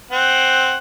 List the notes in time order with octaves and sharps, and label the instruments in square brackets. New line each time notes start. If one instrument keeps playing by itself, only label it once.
[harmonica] C4 F#5